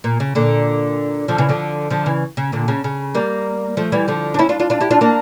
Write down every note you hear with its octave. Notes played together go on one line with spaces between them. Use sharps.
A#2
C#3
A#2 D3
D3 F3
C#3 E3
D3 F3
D3 F3
C#3 E3
C#3
A#2 D3
C#3
C#3
G3 A#3
F3 A3
E3 G3
D3 F3
D4
C#4 E4
D4 F4
D4 F4
D4 F4
E4 G4
D4 F4
A#3 D4